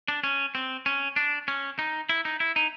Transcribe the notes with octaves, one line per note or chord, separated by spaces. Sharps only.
D4
C#4
C4
C#4
D4
C#4
D#4
E4
D#4
E4
D#4